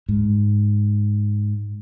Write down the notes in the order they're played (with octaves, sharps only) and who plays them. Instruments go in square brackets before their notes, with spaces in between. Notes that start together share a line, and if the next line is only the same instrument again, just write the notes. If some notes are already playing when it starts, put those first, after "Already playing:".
[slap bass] G#2